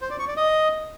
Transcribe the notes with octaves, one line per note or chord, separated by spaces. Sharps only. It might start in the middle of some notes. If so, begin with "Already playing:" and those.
C5
D5
C#6
D5
D#5